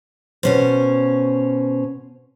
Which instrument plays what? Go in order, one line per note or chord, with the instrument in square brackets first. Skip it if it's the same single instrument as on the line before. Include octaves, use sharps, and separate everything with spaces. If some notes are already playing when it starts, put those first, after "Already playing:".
[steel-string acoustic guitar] B2 C#4 C5